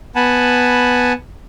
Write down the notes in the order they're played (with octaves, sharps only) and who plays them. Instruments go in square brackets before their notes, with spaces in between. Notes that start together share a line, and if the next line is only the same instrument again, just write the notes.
[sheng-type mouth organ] B3 F#5 G#5 A5 B5